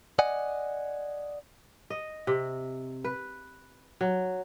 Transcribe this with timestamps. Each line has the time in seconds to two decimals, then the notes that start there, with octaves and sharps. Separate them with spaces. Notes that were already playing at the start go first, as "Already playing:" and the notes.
0.19 D5 D#5 F#5 G#5
1.90 D#5
2.27 C3
3.04 B4
4.01 F#3